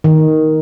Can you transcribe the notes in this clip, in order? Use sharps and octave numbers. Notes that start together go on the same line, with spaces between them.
D#3